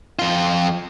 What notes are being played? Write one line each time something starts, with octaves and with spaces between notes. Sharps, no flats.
F2 F4